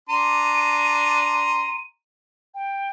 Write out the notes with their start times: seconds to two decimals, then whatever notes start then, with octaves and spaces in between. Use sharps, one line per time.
0.09 D4 A#5 C6 D#7
2.55 G5